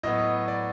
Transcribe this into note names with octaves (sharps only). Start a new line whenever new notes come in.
A2 F#3 B3 D#5
D5